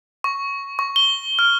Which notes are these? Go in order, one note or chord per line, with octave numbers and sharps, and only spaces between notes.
C#6
C#6
G7
F6